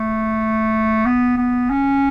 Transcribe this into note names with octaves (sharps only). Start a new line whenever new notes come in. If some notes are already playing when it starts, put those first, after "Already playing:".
Already playing: A3
B3
B3
C#4